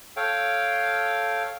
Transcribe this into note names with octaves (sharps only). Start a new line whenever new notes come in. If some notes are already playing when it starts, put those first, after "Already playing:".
A4 C#5 F5 G5